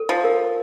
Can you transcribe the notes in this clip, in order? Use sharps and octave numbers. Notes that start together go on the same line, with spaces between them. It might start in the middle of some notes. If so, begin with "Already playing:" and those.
Already playing: A4
F3
A#4